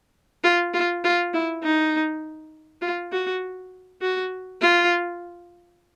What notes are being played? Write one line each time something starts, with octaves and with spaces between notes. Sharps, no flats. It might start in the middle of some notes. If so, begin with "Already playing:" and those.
F4
F4
F4
E4
D#4
F4
F#4
F#4
F4